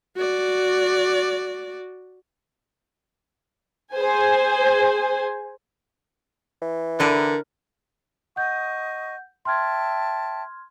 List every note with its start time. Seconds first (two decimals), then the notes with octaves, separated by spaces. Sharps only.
0.16 F#4 D5
3.94 G#4 C5 G#5
6.62 E3
7.00 D3 D4 E4 A#4 B4
8.36 D#5 F#5 C#6 D#6 G6
9.45 E5 G5 A5 C6 F6 G#6